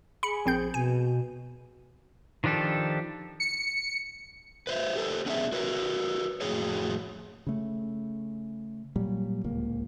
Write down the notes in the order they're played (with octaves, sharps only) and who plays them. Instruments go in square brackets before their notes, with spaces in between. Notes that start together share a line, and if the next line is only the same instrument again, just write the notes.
[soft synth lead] G#4 [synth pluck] B5 C#7
[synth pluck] A#1 C4 G6
[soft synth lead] B2 [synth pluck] G#5
[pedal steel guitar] D#3 F3 D4 G4 A4
[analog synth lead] C#7
[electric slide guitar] B4 C5 E5
G4 A4 C5
B3 C#4 D4 G#4 E5
F#4 A#4 B4 C#5
F2 A2 F#4 G#4 C#5
[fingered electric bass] C#3 A3
A#2 F#3 G3
D1 C#2 A#3